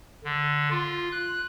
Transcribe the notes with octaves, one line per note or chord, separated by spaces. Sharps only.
D3
F4
F#6